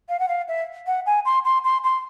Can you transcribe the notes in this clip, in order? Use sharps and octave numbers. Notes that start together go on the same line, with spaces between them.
F5
F#5
F5
E5
F#5
G#5
C6
C6
C6
C6